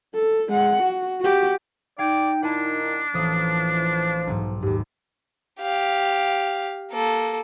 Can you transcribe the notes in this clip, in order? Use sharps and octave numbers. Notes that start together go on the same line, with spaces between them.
A4
G#3 F#5
F#4
F#4 G4
D#4 D5 F5 G5 G#6
A#2 D#3 D4 E4 F#5 G#5 A5
A1 E3 F3 A#3 D#6
F5 G6
B1 G#2
D#2 G#2 G4
G4 F5
A#3 A4